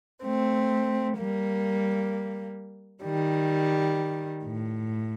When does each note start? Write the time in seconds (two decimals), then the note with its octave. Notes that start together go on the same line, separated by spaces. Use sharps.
0.24 A3 C4
1.17 G3 A#3
3.03 D#3 G3
4.43 A2